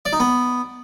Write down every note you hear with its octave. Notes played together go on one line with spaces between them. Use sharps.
D5
D#4
B3